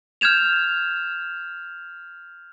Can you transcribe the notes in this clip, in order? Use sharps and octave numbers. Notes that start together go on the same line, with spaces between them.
F6 G6 G#6 E7 F7